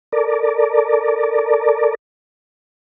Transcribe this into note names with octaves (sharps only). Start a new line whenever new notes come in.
A4 A#4 D5